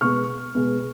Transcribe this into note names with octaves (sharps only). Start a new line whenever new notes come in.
B2 G#3 B3 C#6 F6
B2 G#3 B3